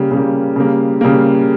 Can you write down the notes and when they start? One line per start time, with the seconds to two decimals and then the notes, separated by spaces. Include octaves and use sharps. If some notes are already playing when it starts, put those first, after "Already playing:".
Already playing: C#3 G3 A#3
0.11 C#3 G3 A#3
0.56 C#3 G3 A#3
1.01 C#3 G3 A#3